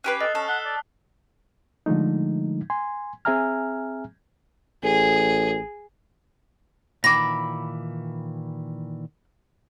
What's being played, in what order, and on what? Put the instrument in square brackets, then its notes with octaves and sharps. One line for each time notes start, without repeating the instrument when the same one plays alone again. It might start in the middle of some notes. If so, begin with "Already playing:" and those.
[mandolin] C#4 G4 B4 [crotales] F#6 C7
[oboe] A4 [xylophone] D#5 [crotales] D#6 F6 F#6
[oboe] C#4 [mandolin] A4
[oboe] F#5 [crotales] E6 B6 G7
[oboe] D5
[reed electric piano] D3 F3 G#3 A3 D#4
G#5 C6
C4 G#4 E5 G#5 A#5 F6
[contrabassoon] A1 [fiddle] G#4
[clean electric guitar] A#2 D#3 E3 [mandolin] B5 D6 [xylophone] A#6